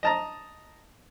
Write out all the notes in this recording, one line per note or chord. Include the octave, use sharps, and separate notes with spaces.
D#5 A5 A#5